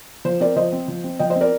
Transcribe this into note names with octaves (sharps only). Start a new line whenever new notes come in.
F3 C5
C4 A#4 D5
F3 C5 D#5
C4
F3
C4
F3 D#5 G5
C5 D#5
C4
A#4 D5